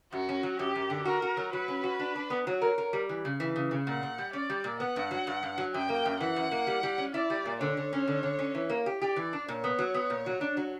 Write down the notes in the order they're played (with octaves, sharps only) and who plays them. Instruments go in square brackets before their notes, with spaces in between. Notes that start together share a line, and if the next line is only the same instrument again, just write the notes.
[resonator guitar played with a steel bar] F#2 [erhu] F#4
[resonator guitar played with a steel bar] C#4
F#3
[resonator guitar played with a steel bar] F#2 [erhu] G4
[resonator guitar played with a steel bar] F#2
D3
[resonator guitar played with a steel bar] F#4 [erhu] A#4
[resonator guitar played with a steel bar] F#4
F#3
[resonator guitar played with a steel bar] F#3 [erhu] B4
[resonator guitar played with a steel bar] C#4
F#4
D4
D4
B3
[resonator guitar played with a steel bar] F#3 [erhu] C#5
[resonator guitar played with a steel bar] A#4
A#4
G3
E3
C#3
E3
C#3
C#3
[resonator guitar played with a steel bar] A#2 [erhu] F#5
[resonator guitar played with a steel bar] A#2
G3
[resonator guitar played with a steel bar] C#4 [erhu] D5
[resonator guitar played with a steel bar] G3
A#2
[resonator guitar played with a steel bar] B3 [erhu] F#5
[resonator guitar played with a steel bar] G2
F#3
G2
G2
F#3
[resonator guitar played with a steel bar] F#2 [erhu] G5
[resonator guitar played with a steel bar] A#3
F#2
[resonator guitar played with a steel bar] E3 [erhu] F#5
[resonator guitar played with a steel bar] F#2
A#3
G3
G3
C#4
[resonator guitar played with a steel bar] E4 [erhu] D5
[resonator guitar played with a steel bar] G3
A#2
[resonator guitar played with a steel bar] D3 [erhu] C#5
[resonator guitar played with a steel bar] D3
C#4
D3
D3
C#4
E3
A#3
G4
[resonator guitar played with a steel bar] G4 [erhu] D5
[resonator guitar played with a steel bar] E3
D4
[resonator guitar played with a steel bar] A#2 [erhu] C#5
[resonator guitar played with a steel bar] B3
F#3
B3
A#2
F#3
D4
F#3